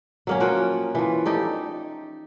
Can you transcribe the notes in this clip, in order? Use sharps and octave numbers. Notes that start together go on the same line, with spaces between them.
F#3 A#3 C#4
F3 F#4 G5
E3 F3
D#4 G4 A4